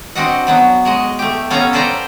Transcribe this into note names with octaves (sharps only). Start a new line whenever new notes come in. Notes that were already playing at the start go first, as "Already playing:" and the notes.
C4 D4 F#4 D#5 F#5
F#3 B3 F#4
G#3 F#4 D#5
A3 G4
B3 C#4 A4 F5 G#5 A#5
A4 B4 C5 D5 G5 A#5